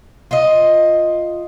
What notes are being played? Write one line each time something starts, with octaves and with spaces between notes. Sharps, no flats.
F4 D#5